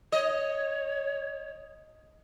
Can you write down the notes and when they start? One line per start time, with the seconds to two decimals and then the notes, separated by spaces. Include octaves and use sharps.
0.12 C#5 D#5